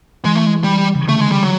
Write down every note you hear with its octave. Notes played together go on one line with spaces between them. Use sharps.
E3 G#3
A3
G#3
G3
C#3
D3 A3
G#3
G3
F#3